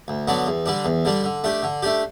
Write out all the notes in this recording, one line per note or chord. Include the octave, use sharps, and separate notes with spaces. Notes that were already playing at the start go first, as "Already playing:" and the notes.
D2
D3 F#3 B3 D4
E2
D3 G3 D4
E2
D3 G3 D4
D3
A3 D4 G4
D3
A3 D4 G4